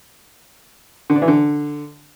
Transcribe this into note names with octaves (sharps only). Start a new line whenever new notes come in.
D3
D4
E3
D3